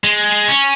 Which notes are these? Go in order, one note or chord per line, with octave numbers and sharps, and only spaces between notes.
G#3
C#4